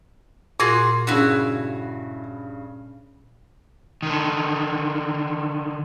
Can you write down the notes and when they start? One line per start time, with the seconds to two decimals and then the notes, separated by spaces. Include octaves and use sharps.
0.60 A#2 F4 F#4 G#4
1.07 G2 C#3 E4 F#4
4.02 D3 D#3